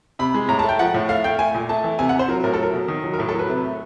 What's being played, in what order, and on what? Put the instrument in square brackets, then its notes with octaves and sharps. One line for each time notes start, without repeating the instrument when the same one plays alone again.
[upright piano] C3 B5
G#3
A2 A#5
A5
A3
G5
F3 F#5
A2
A3 F5
A3 G5
A3 G#5
A#2
A3 A5
E3
C3 G#5
F#5
C3 C5
F#3 A#4
A2 A#4
A4
F#3 A#4
B2
D#3
F#3
A#4
A2 A4
A4
F#3 B4
C3
A3